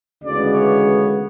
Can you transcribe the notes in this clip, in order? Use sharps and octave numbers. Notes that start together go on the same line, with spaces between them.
D2 C#3 E3 G#3 B3 D5
C#5